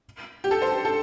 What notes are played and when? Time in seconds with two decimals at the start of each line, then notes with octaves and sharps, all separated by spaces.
0.44 G4
0.51 A4
0.62 C5
0.85 A4